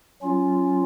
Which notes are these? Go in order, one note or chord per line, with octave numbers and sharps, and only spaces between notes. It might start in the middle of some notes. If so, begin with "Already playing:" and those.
F#3 C#4 F4